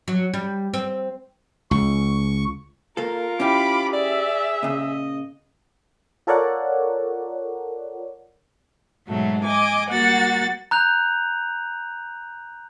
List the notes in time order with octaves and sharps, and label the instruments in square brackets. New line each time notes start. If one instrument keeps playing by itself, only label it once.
[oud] F#3
G3
C4
[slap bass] C#2 [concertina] C#6
[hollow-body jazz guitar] A#3 A4 [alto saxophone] F4 [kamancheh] A#4
[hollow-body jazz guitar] C#4 E4 G4 [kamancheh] B5 D6
[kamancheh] G#4 E5 [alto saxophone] D5
[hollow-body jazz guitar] A#2 C#3 [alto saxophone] D#5
[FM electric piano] F4 A4 A#4 C#5 D5 F#5
[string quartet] G#2 B2 F#3 A3
D#5 G#5 D6
G3 A#3 F#4 F#5 A6
[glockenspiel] A#5 F#6 G6 F7